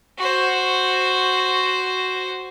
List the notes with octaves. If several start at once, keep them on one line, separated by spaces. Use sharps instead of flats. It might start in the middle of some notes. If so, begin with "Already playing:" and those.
F#4 C5